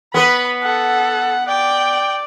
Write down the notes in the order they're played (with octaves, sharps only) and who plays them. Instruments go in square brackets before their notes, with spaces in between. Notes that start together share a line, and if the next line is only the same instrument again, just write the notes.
[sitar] B3 B4 [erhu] B5
[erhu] A4 [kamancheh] F#5
[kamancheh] D5 [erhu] G5